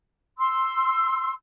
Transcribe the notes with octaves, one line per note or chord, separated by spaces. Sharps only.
C6 E6